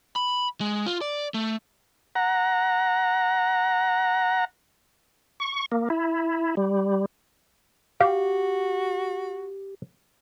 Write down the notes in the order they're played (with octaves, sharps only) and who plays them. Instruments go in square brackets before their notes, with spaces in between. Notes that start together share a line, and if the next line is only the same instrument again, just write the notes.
[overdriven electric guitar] B5
G#3
F4
D5
A3
[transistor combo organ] F#5 A#5
[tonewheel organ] C#6
A#3
E4
G3
[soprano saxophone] F#4 [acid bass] G4 [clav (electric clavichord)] F5